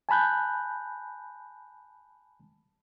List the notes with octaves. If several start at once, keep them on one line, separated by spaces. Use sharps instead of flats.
G#5 A5 B5 F#6 G6